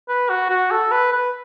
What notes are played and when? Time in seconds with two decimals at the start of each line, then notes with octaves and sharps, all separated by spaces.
0.09 B4
0.29 F#4
0.50 F#4
0.71 A4
0.92 B4
1.12 B4